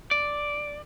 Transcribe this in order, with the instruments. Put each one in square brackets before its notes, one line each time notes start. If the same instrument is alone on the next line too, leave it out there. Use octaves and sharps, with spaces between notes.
[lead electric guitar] D5